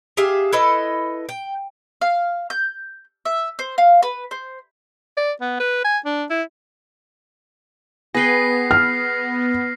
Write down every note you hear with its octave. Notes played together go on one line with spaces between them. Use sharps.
G4 G#4 E5 F5
E4 A4 B4 D#5
G5
F5
G6
E5
C5
F5
B4
C5
D5
B3
B4
G#5
D4
E4
B3 G#4 B4 G5 A#6 C7
F6